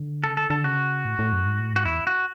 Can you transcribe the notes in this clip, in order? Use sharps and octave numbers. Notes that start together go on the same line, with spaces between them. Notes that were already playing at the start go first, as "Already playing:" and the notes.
Already playing: D3
C#3 A4
D3 A4
D3 A4
C#3 F#4
A2
A2
F#2
G#2
A2
G#2 F#4
E2 E4
F#4